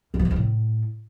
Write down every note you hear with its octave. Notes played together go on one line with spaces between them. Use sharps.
G2
F3
G#2
F3
A2